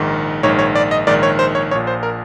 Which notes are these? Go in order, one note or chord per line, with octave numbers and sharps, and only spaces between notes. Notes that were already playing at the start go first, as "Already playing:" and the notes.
Already playing: A#1 G#2 D#3
A#1 G#2 D#3 C#5
C#5
D5
D#5
A#1 G#2 D#3 D5
C#5
C5
C#5
A#1 A#2 C#5
C5
A#4